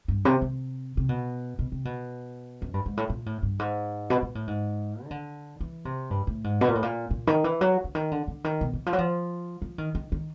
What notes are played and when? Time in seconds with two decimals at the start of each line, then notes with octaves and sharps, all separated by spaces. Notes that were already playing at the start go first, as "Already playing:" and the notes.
0.08 G2
0.25 C3
0.42 C3
0.97 C3
1.09 B2
1.59 B2
1.72 C3
1.85 B2
2.62 F#2
2.74 G2
2.86 G#2
2.97 A2
3.10 A#2
3.26 A2
3.43 G2
3.59 G#2
4.10 B2
4.22 A#2
4.35 A2
4.47 G#2
5.05 D#3
5.11 D3
5.60 E3
5.85 C3
6.10 G2
6.27 A2
6.44 G#2
6.61 B2
6.68 A#2
6.75 A2
6.83 A#2
7.11 A#2
7.27 D#3
7.44 E3
7.61 F#3
7.84 D3
7.95 D#3
8.11 D3
8.28 D3
8.44 D#3
8.61 B2
8.73 E3
8.86 F3
8.93 F#3
8.98 F3
9.62 F3
9.78 D#3
9.95 D#3
10.12 D#3